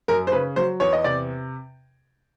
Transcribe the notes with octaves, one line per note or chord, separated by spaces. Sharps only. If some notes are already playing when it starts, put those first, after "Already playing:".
F#2 A#4
C5
C#3 B4
F#3 C5
E2 C#5
D#5
C3 D5